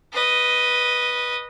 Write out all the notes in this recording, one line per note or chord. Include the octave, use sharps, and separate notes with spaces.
B4 D#5